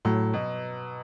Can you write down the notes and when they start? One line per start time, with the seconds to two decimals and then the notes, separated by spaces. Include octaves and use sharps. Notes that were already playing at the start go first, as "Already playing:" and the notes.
0.05 A2 F#3
0.33 B2